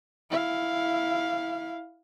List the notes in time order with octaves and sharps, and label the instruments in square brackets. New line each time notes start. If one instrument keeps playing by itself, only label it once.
[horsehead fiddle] E4 F5